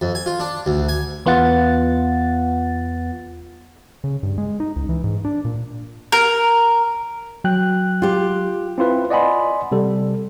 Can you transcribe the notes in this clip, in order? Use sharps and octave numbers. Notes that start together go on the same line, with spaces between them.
F2
G#5
F4
D4
D2
G#5
E2 B3 F4 F#5 A6
C#3
G2
G#3
D#4
C#2
E3
G#2
D4
A#2
A#4
F#3 G5 F#6
F4 G4
C4 E4 F4 B4
D5 D#5 F#5 G#5 B5 C6
C3 G3 A4